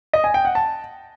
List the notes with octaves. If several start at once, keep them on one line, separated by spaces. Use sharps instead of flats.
D#5
G#5
G5
F#5
A5